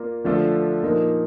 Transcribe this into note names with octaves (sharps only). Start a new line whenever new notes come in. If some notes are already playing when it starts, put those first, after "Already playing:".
Already playing: A#3 F4 A#4 D5
D3 F3 A3 D4 F4
A#2 F3 A#3 D#4 A#4